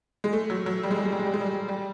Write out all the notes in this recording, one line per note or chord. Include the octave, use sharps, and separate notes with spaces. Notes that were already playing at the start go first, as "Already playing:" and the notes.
G#3
A3
F#3
F#3
G3
G#3
G3
G#3
G3
G#3
G3
G#3
G3
G3